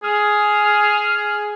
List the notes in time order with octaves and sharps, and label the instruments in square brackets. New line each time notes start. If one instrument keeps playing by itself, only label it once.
[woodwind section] G#4 F6